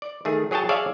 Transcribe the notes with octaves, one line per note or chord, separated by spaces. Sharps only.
D5
D#3 A3 G#4
F#3 G#4 C#5 G5 A5
G#4 C#5 D5 E5 F5 G#5